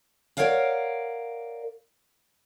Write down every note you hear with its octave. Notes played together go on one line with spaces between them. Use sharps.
A#4 C#5 D5 F5 F#5